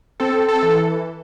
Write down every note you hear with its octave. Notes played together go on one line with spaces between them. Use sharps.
C4 A4
A4
E3